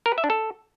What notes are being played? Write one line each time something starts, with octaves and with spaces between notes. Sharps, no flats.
A#4
B4
E5
D4
A4